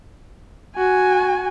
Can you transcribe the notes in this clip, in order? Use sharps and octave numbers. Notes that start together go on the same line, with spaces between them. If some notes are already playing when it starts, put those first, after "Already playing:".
F#4 G#5